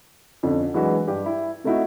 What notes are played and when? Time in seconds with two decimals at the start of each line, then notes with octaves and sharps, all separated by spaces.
0.43 F2 D3 C#4
0.74 E3 F#3 G#3 D4 F#4 B4
1.07 G2 G4
1.26 E4
1.64 C3 A3 D#4 E4 F#4